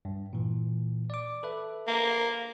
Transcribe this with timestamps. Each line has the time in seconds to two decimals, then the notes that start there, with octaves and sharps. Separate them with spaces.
0.05 G2
0.33 A#2 E3
1.10 D5 D6
1.43 A4 B4 E5
1.87 A#3